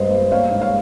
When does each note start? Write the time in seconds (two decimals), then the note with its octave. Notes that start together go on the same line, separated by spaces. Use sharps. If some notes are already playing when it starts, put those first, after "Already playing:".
Already playing: G2 G#3 C5 D#5
0.11 G2
0.32 A#3 C#5 F5
0.51 G#2
0.61 C#5 F5